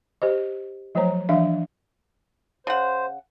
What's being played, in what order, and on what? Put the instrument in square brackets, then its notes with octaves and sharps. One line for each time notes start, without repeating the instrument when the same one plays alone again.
[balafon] G4 C5 D#5
F3 F#3 A3 C5 C#5 A#5
E3 F3 D4 E5 F5
[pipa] C#3 F#5 [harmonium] C5